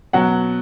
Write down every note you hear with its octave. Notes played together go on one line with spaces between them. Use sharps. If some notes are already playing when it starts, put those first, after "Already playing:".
B2 F#3 F#5